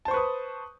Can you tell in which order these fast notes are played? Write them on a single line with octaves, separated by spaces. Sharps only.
A5 C5 C#6 B4 D#6